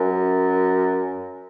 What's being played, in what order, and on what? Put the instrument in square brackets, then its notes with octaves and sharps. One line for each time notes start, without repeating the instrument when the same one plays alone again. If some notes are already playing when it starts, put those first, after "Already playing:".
Already playing: [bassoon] F#2